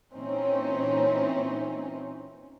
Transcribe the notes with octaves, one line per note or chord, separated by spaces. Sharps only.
A#2 E3 C4 C#4 D#4